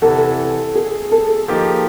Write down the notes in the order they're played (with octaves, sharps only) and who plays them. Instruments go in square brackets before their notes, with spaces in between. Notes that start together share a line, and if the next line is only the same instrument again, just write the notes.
[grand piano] E2 C3 E3 [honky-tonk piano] A4
[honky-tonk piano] G#4
A4
[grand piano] F3 A#3 D#4 G4